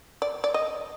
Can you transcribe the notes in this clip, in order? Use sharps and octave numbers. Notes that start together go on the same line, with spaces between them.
D5
D5
D#5